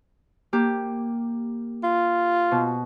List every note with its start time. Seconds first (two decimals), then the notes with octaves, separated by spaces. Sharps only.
0.53 A#3 G4
1.84 F4
2.51 B2